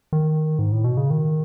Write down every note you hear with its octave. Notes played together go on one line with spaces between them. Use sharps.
D#3
G#2
A2
B2
C#3
D#3